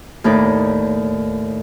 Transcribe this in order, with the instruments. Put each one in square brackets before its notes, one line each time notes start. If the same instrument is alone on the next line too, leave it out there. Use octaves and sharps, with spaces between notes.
[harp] D#2 A2 D#4 D5